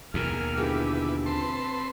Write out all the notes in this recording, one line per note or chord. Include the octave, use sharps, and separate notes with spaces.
D#2 B2 G#4 A#4 F6
D3 E4 F4 G4 G#4 B4
C4 B4 A5 C6